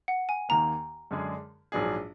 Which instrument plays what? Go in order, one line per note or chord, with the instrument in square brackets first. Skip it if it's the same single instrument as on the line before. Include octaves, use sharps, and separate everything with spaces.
[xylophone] F#5
G#5
[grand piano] D#2 D#3 A#3 [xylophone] A#5
[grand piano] F#2 D3 G#3 D4 G#4
A#1 G#2 F#3 D4 G#4